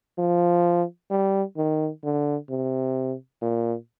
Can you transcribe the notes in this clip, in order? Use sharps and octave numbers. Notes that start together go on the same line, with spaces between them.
F3
G3
D#3
D3
C3
A#2